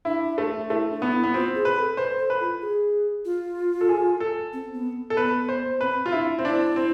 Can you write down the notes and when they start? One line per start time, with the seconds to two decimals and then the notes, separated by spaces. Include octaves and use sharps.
0.05 D4 E4
0.38 A3
0.70 A3 E4
0.91 D4
1.02 B3
1.12 E4
1.23 B3
1.34 C4 F4
1.55 G#4
1.65 B4
1.76 A4
1.97 B4 C5
2.19 A4
2.30 B4
2.40 F4
2.61 G#4
3.25 F4
3.81 A4
3.89 G#4
4.20 A4
4.53 C4
4.74 B3
5.10 A4
5.17 B3 B4
5.49 C5
5.81 C4 B4
6.06 F4
6.12 D4 E4
6.39 C4
6.45 D4 E4
6.76 C4